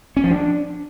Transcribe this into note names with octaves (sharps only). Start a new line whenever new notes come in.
C#4
F3
D4